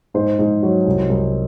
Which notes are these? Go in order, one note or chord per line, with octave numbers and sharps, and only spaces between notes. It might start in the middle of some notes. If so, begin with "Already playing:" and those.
G#2 C5
G#2
F#3
C2
C2